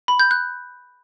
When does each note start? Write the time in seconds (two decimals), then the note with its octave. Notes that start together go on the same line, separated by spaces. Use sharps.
0.08 B5
0.19 G6
0.31 F#6